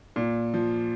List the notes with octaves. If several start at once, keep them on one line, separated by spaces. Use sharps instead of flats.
A#2
F3